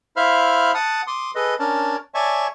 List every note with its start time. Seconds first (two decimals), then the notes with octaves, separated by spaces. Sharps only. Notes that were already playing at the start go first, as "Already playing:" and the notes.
0.16 E4 C5 E5 F5 B5 F6
0.74 F#5 A5 D#6
1.07 C6 D6 D#6
1.35 G#4 A4 B4 D#5
1.59 C#4 D4 A#4 C#5 A5
2.14 C#5 D5 E5 G#5 A5 C#6